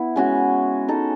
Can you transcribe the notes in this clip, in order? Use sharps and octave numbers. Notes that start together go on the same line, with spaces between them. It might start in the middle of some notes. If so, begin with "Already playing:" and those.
Already playing: B3 E4
G#3 C#4 F#4
G#3 D#4 A4